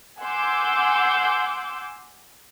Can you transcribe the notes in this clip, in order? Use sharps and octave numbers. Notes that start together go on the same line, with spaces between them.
F#5 G#5 C6 D6 E6 G6